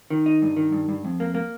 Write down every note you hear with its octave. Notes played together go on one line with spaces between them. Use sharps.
D#3
D#4
G2
D#3
G2
G2
F2
A#3
A#3